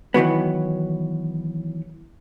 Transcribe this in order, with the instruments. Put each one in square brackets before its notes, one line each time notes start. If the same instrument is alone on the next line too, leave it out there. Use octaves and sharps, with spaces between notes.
[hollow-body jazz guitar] D#3 E3 F#3 B3